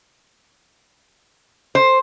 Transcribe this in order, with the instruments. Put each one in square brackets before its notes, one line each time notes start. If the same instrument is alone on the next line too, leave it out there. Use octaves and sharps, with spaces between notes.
[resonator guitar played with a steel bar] C5